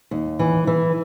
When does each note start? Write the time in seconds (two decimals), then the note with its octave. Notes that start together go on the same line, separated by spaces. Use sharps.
0.11 D#2
0.39 E3
0.67 E3